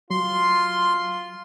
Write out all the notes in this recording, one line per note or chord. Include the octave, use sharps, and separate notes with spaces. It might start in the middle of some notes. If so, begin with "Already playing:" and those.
F#3 F4 C6